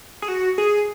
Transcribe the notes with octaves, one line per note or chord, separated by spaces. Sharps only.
G#4
F#4
G#4